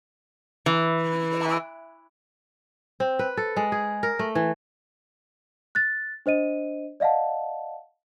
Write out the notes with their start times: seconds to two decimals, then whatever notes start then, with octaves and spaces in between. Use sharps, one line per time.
0.66 E3
3.00 C4
3.19 B4
3.37 A4
3.57 G#3
3.72 G#4
4.03 A#4
4.19 A3
4.35 E3
5.75 F#6 A6
6.26 D4 C5 D#5 D#7
7.00 D5 D#5 F5 F#5 A5